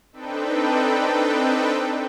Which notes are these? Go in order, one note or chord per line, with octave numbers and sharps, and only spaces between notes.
C4 D4 D#4 A4 B4 G5